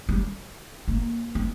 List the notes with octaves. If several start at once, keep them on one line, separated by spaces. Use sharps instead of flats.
G3
A#3
C4